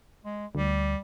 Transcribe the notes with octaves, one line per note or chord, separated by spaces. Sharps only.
G#3
D2 G3